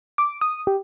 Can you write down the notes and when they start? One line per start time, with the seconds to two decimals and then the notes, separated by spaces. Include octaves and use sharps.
0.18 D6
0.41 D#6
0.67 G4